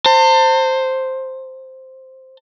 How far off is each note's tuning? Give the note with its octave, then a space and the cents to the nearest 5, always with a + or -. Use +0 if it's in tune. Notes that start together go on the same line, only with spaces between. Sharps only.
C5 +0 A5 +40